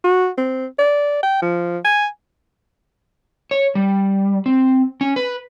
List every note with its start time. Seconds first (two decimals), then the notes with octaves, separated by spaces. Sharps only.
0.04 F#4
0.38 C4
0.79 D5
1.23 G5
1.42 F3
1.84 G#5
3.51 C#5
3.75 G3
4.46 C4
5.01 C#4
5.16 B4